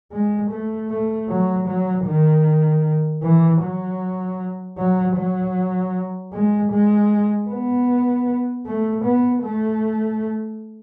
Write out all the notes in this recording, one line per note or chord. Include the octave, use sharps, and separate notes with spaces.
G#3
A3
A3
F#3
F#3
D#3
E3
F#3
F#3
F#3
G#3
G#3
B3
A3
B3
A3